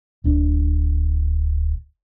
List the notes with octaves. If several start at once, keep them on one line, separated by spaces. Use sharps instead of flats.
D1 D4